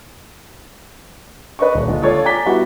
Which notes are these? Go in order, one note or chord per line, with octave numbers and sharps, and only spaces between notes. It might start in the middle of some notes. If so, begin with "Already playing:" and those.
B4 D5 D#5 C#6
D#1
D3 G#3 F4
F4 A4 C#5 D5 F5
G#5 A#5 D6 A6 B6 G7
G3 B3 E4 F#4